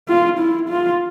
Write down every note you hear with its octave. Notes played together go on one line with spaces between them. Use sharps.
F4
E4
F4